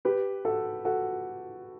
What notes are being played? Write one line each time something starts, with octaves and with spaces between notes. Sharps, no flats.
G4 B4
F#4 A4
F#4 A4